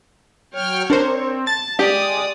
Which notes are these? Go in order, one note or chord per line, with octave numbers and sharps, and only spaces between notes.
F#3 C#5 G5 F6
C4 D4 A#4 C5
A5 A6
G#3 G4 D5 D#6